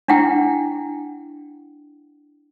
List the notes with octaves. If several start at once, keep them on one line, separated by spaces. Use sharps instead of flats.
D4 E4 F#5 G5